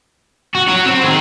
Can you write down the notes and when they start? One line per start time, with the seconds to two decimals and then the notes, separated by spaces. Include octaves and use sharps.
0.55 F#4
0.68 F#4 C#5
0.86 C4
1.03 D#3 G#4